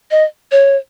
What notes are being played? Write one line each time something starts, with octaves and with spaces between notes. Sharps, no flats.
D#5
C#5